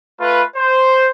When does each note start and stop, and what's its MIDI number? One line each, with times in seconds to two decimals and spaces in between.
0.20 0.43 57
0.20 0.43 65
0.20 0.43 71
0.56 1.10 72